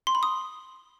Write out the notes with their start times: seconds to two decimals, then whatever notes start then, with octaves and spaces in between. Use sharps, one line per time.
0.07 C6
0.15 B5
0.23 D#6